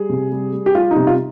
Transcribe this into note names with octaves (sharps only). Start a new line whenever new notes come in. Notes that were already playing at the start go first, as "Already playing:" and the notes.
Already playing: G3 G#4
C3
G3
G3
G4
G3 F4
D#4
C3
F4